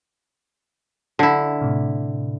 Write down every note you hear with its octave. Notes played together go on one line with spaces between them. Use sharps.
D3 E4
A2 C3